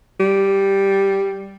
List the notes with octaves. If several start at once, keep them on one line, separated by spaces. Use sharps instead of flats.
G3